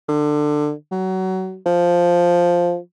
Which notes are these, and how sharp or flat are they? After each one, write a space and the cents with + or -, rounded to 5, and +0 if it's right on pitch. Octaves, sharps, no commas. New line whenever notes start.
D3 +20
F#3 +25
F3 +0